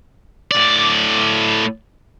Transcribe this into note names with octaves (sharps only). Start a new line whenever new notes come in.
A2 D5